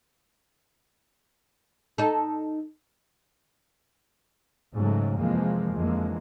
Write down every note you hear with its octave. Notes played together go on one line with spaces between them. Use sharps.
D#4 A4
G#2 C#3 F#3 G#3 A3
F2 C3 E3 F3 G#3 A#3
F2 D3 E3 G#3 A#3